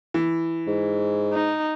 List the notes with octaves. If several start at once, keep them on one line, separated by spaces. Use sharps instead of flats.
E3
G#2
D#4